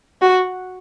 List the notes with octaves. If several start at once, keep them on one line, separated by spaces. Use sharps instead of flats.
F#4